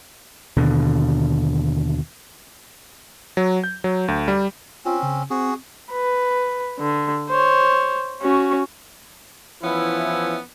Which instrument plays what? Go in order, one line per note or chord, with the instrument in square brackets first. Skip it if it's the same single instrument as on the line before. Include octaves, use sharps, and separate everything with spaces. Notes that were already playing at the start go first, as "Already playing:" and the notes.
[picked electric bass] D#2 B2 D3
[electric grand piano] F#3
G6
F#3
D2
G3
[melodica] C4 C#4 [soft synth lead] F4
[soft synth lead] C#3
[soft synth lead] C4 [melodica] F#4 G#4
[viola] B4
D3
C5 C#5
C#4 F#4
[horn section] E3 F3 B3 C#4 E4